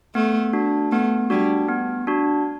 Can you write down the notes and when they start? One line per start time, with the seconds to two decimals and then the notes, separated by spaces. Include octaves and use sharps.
0.15 A3 B3
0.53 D4 F#4
0.92 A3 B3
1.30 G3 D4 F#4
1.69 B3
2.07 D4 F#4